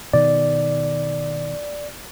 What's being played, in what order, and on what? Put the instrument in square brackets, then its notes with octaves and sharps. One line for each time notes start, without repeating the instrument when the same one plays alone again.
[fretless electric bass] B2 D#3 [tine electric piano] D5